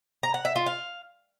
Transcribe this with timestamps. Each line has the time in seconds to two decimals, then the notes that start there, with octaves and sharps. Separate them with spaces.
0.23 A#5
0.34 F#5
0.45 E5
0.56 F4
0.66 F5